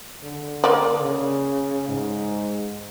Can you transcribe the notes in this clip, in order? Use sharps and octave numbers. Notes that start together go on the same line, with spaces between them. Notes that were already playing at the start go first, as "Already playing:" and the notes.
D3
A#3 D5
C#3
G#2